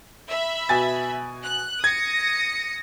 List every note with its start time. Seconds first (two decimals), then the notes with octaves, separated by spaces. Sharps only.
0.30 E5 B5
0.69 B2 G#5 A6
1.44 F#6
1.84 D#6 G#6 A#6 C#7